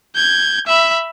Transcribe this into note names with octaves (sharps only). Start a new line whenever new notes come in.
G6 G#6
E5 B5